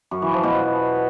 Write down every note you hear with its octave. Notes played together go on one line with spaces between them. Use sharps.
F#2
E3
F3
B2